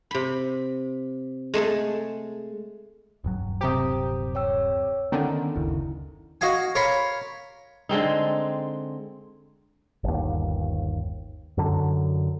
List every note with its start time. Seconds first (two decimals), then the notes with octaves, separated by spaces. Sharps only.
0.11 C3 B5
1.54 G#3 A3 G#4 A4
3.24 D#1 G2 F#3
3.61 C3 G4 C5 A#5 D#6
4.35 C#5 G5 E6
5.12 D3 D#3 B3 C#4 A#5
5.56 F#1 D2 C#3 E4
6.41 F#4 D#5 F5 G#5
6.75 A#4 C#5 F5 B5 C6
7.89 D3 G#3 C4 D#4
10.04 G1 D#2
11.58 F#2 D3